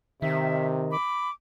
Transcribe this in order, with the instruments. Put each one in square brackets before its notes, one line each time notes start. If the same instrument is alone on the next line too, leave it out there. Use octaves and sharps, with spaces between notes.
[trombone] C3 [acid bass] D#3 [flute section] E5
[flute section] B5 D6